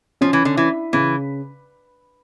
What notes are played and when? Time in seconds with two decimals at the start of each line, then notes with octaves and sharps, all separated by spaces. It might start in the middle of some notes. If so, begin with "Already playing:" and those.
0.21 F3 C#4
0.33 E3
0.45 D3
0.57 E3 E4
0.93 C#3 E3